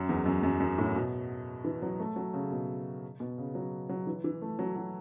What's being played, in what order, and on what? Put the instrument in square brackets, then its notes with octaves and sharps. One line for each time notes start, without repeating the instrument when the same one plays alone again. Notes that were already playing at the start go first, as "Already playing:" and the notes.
Already playing: [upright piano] F#2
E2
F#2
F#2
F#2
A2
B2
E3
F#3
A3
F#3
C#3
B2
B2
C#3
F#3
F#3
E3
E3
A3
F#3
F#3